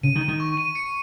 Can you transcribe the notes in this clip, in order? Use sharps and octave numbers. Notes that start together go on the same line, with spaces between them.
C#3 D#7
D#3
D#7
D#3
C#6
D#7
C#7